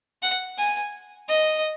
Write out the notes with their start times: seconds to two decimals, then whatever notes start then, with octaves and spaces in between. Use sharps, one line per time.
0.22 F#5
0.58 G#5
1.29 D#5